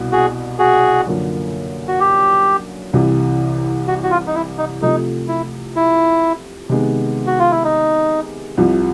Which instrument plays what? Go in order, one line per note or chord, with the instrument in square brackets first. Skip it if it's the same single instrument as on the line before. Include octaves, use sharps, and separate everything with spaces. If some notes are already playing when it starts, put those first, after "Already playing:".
Already playing: [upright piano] C2 B2 G3
[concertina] F#4 G#4
F#4 G#4
[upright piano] F#2 D3 F3 A#3
[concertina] F#4
G4
[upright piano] C2 C3 E3
[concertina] F#4
F#4
F4
D#4
E4
D#4
[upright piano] C3 F3 A3 [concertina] D#4
[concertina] E4
E4
[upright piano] C3 D#3 G#3 B3
[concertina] F#4
F4
E4
D#4
[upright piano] C2 C3 F3